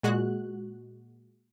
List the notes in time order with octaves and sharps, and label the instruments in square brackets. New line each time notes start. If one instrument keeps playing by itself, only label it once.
[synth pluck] A#2 G#3 F#4 F#6